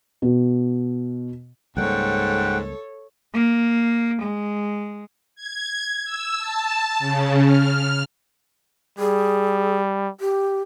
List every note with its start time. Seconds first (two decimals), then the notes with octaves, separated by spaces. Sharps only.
0.22 B2
1.77 C#2 G#2 G3 A#3 A4 C#5 F#5 G5
3.34 A#3
4.22 G#3
5.35 G#6
6.05 E6
6.38 A5
6.99 C#3
7.44 F6
8.99 G3 G#4
10.20 G4